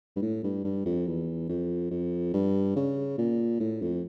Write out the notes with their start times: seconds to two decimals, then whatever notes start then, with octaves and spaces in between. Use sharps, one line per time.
0.16 G2
0.22 A2
0.44 G2
0.64 G2
0.86 F2
1.07 E2
1.49 F2
1.91 F2
2.34 G2
2.76 C#3
3.18 A#2
3.60 A2
3.82 F2